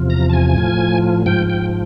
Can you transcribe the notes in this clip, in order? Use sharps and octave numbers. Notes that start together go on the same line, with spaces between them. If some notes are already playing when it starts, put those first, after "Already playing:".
Already playing: E2 C3 F3
A#5
A5
G#5
A2 F3
G#2 F3 G5
G5